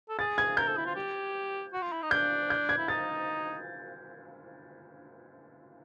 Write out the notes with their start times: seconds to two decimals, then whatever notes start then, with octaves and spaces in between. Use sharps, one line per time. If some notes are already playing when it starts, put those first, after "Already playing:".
0.09 A4
0.19 G#4 A6
0.38 G#6
0.57 A#4 G6
0.67 A4
0.77 E4
0.86 F4
0.96 G4
1.73 F#4
1.82 F4
1.92 E4
2.02 D#4
2.11 D4 G6
2.50 G6
2.69 G#6
2.78 E4
2.88 D#4 A6